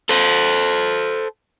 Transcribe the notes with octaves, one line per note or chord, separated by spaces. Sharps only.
A4 C5